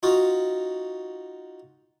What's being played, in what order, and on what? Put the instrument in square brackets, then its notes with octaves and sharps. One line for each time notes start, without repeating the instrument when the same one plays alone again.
[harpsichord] D#4 F4 F#4